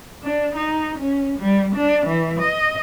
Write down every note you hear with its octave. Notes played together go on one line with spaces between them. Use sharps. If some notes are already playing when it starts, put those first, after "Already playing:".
D4
D#4
C#4
G3
D4
E3
D#5